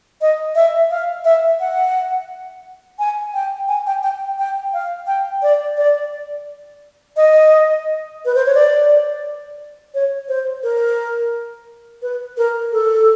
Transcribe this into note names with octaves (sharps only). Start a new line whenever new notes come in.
D#5
E5
F5
E5
F#5
G#5
G5
G#5
G5
G5
G5
F5
G5
D5
D5
D#5
B4
C5
C#5
D5
C#5
C5
A#4
B4
A#4
A4